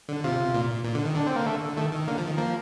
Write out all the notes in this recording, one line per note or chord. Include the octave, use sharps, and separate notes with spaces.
D3
C3 F4
A#2
A#2
D3
D#3
D3 D4
C4
A#3
A3
D#3 A3
D#3
D3 A#3
F3
D#3
F3 A#3